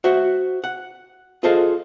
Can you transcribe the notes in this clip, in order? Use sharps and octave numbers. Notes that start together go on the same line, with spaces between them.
F#4 C5 E5 F#5
F#5
F4 G#4 A4 C5 D#5 F5